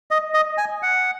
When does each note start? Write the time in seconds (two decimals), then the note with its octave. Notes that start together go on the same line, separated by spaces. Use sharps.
0.11 D#5
0.34 D#5
0.58 G#5
0.83 F#5